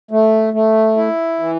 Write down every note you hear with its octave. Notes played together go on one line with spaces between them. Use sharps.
A3
A3
E4
E3